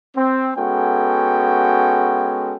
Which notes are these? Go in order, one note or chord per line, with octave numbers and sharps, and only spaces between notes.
C4
G#3 B3 C#4 F#4 A4 G5